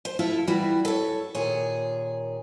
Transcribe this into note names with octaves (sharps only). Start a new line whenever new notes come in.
C5
E4 F4 A4 E5
E3 G3 E4 F#4
A4 C#5
D#2 A#2 G#4 C#5